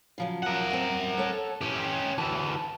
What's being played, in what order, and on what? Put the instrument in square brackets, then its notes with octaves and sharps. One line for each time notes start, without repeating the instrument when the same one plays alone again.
[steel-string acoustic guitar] C#3 F3 F#3
[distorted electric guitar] A#4 F#5
[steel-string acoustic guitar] F#2 C4
A4 C#5 A5
[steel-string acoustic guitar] E3 [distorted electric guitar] C#4 G4
[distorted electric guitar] D2 E3 [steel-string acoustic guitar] A5